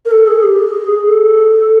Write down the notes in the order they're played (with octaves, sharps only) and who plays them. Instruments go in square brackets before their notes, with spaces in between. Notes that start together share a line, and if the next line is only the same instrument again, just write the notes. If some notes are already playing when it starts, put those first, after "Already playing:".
[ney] A#4
A4
G#4
G4
G#4
A4